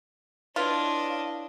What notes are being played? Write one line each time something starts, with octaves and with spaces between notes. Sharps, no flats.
D4 E4 F4 B4 C#5 D#5